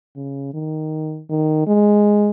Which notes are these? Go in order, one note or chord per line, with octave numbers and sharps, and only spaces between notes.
C#3
D#3
D#3
G#3